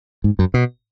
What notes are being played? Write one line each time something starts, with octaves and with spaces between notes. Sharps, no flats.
G#2
F#2
B2